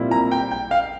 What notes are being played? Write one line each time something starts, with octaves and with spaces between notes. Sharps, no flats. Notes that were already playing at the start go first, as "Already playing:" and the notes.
Already playing: A#2 G3 C4 E4
A#5
G5
G5
F5